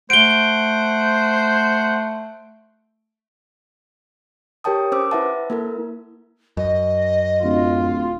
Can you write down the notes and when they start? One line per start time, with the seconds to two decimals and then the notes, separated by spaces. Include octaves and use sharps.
0.10 A3 C5 F#5 D7 G7
4.64 G4 A#4 C#5 G5 A5 D#6
4.92 C#4 C5 D6 E6
5.11 E4 B4 E5 F#5 A5
5.50 A#3 E4 A4 A#4
6.57 F#2 D#5
7.43 D1 F4